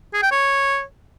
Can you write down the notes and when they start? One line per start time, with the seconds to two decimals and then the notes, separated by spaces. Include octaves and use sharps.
0.14 G#4
0.22 G5
0.31 C#5